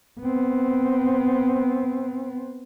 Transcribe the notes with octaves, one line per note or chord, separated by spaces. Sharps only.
B3 C4